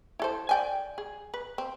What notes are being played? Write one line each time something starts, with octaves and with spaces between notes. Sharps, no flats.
E4 A4 C5
D5 G5 G#5
G#4
B4
C4